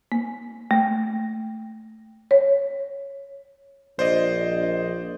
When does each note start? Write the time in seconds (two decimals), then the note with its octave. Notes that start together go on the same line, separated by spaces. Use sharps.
0.12 A#3
0.71 A3
2.31 C#5
3.99 A#1 C5 D5 D#5